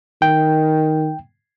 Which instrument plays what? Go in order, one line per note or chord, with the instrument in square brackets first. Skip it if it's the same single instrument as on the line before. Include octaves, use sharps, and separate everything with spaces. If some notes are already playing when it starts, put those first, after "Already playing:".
[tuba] D#3 [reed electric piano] G5